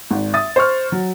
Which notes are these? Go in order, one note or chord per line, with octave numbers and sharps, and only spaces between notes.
G#1
E5 D#6 A6
C5 C#6 F6
F#3